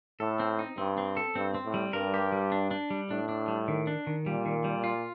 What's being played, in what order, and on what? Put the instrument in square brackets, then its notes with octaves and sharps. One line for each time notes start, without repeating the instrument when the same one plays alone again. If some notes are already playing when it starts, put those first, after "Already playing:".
[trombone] A2 [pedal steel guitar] A4
[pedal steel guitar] C4
D#4
[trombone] G2 [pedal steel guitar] C4
[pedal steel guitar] C4
A4
[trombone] G2 [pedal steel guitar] C4
[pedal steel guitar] C4
[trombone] A2
[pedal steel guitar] G3
[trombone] G2 [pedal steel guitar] A#4
[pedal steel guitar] G4
G3
D4
D4
G3
[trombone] A2 [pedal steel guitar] D4
[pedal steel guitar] D4
G3
D#3
D4
D#3
[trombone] A#2 [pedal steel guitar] G3
[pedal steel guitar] D#3
G3
F4